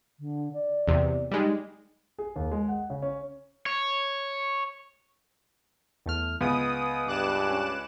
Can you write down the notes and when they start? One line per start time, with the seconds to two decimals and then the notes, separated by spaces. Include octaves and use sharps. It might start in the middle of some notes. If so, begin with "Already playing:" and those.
0.19 D3
0.53 D5
0.88 E2 C3
1.31 G3 G#3 D#4
2.19 G#4
2.36 D#2
2.51 G#3
2.68 F#5
2.90 C#3
3.02 C#4
3.66 C#5
6.06 E2 A3 F6
6.41 C#2 B3 D#6
7.07 G2 D6 F#6 E7
7.51 C#4